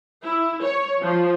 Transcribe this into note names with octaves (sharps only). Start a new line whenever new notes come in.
E4
C#5
F3